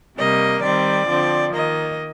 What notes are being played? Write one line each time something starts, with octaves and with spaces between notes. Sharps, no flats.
C3 G3 A#3 D#5
D#3 G3 C4 D5
D3 F3 C4
D#3 A#3 D#5